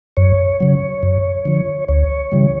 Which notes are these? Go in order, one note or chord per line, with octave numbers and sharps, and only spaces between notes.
F#2 C#5
C#3 F#3
F#2
D3 F3
D2 C#5
C#3 E3 G3